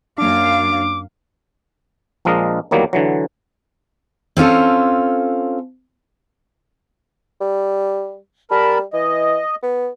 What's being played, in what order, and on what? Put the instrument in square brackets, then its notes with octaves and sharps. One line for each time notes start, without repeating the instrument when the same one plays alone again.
[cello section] F#2 F5 [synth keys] A#3 D4 [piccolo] D6
[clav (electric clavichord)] A#1 F3 G#3 D4 A#4 D#5
E2 D#3 F#3 G3 A#3
D3 E3 F#3
[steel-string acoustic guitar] C4 C#4 F4 A4
[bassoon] G3
[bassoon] G3 [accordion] A#4 A5 B5
[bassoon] E3 [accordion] D#5
[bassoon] B3